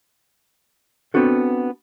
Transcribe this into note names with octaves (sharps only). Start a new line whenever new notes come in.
B3 C4 D4 F#4 A4